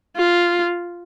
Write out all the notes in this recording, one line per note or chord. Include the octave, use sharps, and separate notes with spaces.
F4